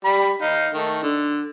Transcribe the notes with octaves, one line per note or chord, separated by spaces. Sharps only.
G3 B5
D#4 F5
D#3 A3
D3